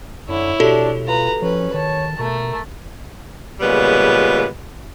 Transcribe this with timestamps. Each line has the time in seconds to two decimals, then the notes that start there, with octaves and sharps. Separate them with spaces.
0.29 F#2 D3 E4 C#5
0.60 B2 D4 F#4 G4 A4
1.07 F4 B4 A#5
1.42 F3 C#4 B4
1.74 D#3 C#5 A5
2.19 B2 A3 A#4
3.60 A#2 C#3 G3 G#3 B3